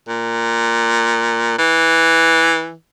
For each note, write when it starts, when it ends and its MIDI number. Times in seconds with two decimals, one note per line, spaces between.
0.08 1.57 46
1.58 2.74 52